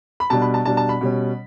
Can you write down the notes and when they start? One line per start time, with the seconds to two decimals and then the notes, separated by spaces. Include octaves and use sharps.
0.20 B5
0.30 B2 G3 D4 A5
0.42 B5
0.54 A5
0.65 B2 G3 D4 A5
0.77 A5
0.89 B5
1.01 B2 G3 C#4